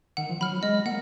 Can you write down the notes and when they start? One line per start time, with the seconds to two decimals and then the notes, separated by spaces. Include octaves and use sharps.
0.17 D#3 F#5
0.29 F3
0.41 F#3 B5 F6
0.52 F#3
0.63 G#3 D#5
0.86 A#3 F#5